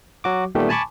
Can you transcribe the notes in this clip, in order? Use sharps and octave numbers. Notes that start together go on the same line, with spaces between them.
F#3 F#4 D6
A#2 D#3 G3 A3 B3 G4
G#5 A5 B5 C#6 D6